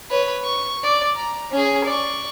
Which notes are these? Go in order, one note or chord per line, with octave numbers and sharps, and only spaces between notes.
B4 C#5
C#6
D5
A#5
C#4 G#4
D5 C#6